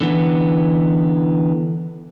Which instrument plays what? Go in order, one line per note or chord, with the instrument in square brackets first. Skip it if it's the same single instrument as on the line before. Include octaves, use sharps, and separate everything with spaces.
[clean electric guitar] D3 E3 B3